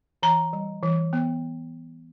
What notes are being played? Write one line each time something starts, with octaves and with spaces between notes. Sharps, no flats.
E3 A#5
G3
E3
B3